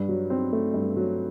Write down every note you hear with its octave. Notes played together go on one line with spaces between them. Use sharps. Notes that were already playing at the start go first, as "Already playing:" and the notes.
Already playing: G2
F#3
C4
A3
G2
F#3